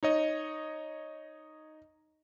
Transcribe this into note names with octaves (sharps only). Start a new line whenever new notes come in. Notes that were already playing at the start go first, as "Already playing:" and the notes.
D#4 C#5 D#5